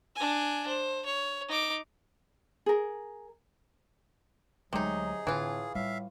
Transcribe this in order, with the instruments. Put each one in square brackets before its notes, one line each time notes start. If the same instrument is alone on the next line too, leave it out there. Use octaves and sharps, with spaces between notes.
[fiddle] D4 G#5
C5
C#5
D#4 D6
[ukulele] G#4 A#4
[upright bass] D2 G#3 [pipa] C3 D#4 [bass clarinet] F#3 [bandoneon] G#4
[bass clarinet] A2 [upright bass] D3 C4 [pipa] E3 F4
[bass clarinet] A2 [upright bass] G3 [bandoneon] E5 F5